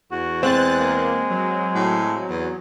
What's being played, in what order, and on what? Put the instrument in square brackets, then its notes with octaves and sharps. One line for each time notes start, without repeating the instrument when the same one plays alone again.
[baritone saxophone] E2 [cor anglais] F#4
[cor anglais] G#3 [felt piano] C4 [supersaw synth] F#6 A6
[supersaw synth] A#3
F#3
[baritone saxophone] A2
E2